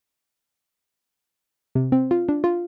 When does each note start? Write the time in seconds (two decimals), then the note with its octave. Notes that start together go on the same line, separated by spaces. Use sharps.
1.75 C3
1.92 C4
2.11 F4
2.29 D4
2.44 F4